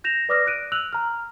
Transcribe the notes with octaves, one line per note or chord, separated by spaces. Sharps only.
G6 A#6 E7 F7
B4 D5 D6 D#6 F6 A#6
F#6 D7 D#7
E6 F#6 F7 F#7
A#5 F6